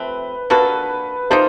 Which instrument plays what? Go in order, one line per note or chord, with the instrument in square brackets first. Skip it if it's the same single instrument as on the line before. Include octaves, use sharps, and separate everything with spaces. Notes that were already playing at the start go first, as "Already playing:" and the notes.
Already playing: [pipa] C3 F3 A3 C4 [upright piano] B4
[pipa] A#3 D4 F#4 A4 [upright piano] B4
[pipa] F3 A#3 D#4 [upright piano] C5